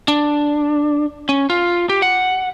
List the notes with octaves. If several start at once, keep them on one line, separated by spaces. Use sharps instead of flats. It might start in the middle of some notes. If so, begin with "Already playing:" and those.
D4
C#4
F4
G4
F#5